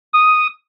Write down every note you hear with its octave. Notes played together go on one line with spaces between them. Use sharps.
D#6